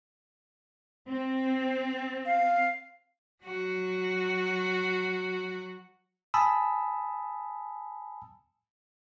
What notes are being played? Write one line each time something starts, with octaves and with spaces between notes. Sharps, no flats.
C4
F5
F#3 F#4
G#5 A5 B5 D#6 E6